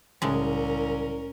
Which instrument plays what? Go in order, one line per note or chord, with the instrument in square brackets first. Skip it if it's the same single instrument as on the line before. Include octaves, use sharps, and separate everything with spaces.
[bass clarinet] C2 [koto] A2 G#3 [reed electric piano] C#3 F#3 [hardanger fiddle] C#4 A#4